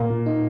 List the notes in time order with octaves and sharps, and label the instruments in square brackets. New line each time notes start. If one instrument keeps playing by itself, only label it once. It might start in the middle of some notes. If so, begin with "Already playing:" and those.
Already playing: [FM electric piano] A#2 A#4 [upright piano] A#3
[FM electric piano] A#2
D#4